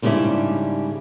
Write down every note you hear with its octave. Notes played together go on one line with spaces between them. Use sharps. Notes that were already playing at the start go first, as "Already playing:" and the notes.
G#2 C#3 G3 C#4 D4 E4